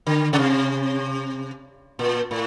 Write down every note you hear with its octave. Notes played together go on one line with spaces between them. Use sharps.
D3
C#3
C3
A#2
A2